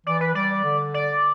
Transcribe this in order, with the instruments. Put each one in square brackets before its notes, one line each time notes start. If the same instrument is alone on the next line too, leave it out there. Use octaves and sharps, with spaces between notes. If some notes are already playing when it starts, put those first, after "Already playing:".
[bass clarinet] E3 [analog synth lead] D5
[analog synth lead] B4
[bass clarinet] G3 [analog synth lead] D5
[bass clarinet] D3
[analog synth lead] D5